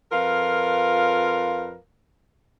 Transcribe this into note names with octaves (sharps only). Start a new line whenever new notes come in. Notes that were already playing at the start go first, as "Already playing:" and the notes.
F2 F4 A#4 B4 F5